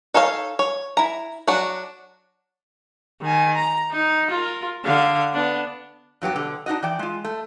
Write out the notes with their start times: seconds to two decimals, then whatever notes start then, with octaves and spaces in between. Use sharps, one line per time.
0.14 D#4 A4 C#5 F5
0.59 C#5
0.97 E4 A#5
1.48 F#3 D4 F#4
3.22 D#3 G#5
3.55 A#5
3.91 D#4
4.31 F4 A#4
4.85 D3 F5
5.33 B3 D4
6.22 G2 F#3 B3 G4
6.36 B2 D3
6.66 D4 D#4 F#4 D#5
6.83 E3 D5 G5
6.99 G#3 F4
7.25 A3